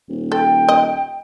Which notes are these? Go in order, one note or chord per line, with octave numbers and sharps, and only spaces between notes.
D#1
A4 G5
D#5